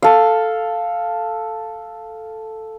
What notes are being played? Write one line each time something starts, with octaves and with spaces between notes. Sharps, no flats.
A4 F5